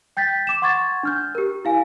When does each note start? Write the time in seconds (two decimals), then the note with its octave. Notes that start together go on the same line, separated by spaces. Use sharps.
0.17 G5 G6 A6 B6
0.47 D6 E7
0.62 F#5 C6 C#6 G#6 A6
1.03 D4 F6 G6
1.35 G4 A#4
1.65 E4 F5 G#5